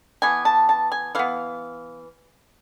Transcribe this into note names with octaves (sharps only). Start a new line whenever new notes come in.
E3 B3 G#5
A5
A5
G#5
E3 B3 F5